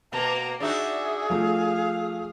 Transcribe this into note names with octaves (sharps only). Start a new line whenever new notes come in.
B2 A#3 A5 A#5
D4 D#4 F#4 G#4 E5
F3 A3 F5